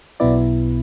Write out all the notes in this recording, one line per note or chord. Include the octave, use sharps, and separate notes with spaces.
B1 B2 B3 E4 D5